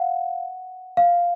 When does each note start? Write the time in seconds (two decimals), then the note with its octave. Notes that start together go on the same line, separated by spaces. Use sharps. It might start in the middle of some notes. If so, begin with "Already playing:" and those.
Already playing: F5 F#5
0.97 F5